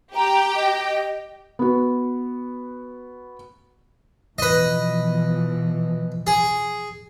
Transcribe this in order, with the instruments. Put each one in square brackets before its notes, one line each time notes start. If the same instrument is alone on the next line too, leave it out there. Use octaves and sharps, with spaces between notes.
[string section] G4 G5 [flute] A#5
[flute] D#5
[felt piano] B3 F#4
[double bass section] B2 E3 F3 [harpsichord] B4 D#5
[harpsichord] G#4